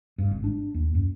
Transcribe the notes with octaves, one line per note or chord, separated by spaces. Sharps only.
G2
G#1
D4
D#2
F#2